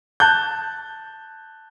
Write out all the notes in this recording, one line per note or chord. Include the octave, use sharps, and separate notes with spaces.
A5 F#6 G6